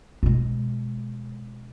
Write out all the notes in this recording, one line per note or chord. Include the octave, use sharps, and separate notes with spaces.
B2 G#3